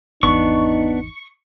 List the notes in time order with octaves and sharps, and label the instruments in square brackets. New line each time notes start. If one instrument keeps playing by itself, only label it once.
[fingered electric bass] G#1 E2 [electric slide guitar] B3 D4 [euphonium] D#4 [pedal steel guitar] C#6